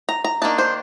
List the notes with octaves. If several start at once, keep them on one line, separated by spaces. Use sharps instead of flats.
A#5
A#5
D#3 A#3 D4 A5
C5